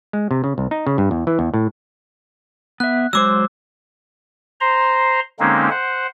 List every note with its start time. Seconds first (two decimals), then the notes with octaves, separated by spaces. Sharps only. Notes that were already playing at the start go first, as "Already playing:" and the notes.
0.13 G#3
0.31 C3
0.44 C#3
0.58 C2
0.71 D#4
0.87 C#3
0.98 G2
1.11 E2
1.27 E3
1.39 E2
1.54 A2
2.80 B3 E5 F#6
3.13 F#3 G#3 C5 D6 E6
4.61 C5 A#5 C6
5.40 D3 G#3 A#3 C4 C#4 D#4
5.70 C5 F#5